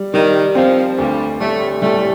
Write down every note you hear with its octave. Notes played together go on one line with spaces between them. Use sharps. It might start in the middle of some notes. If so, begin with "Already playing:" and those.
Already playing: G3
D#3 G3
F3 C4
D2 G2 G3
A2 G3 A3
A2 G3 A3